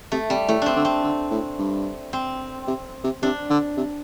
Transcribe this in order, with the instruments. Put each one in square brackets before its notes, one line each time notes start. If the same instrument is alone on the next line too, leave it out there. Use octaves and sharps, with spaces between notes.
[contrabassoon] C3 [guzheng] A3
[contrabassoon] C3 [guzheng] G3
[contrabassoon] A2 [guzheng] A3
[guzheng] C4 D4
[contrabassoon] D3
[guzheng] C4
[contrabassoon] D3
A2
G2
[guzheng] C4
[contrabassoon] C3
C3
[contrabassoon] C3 [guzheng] D4
[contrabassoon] D3
C3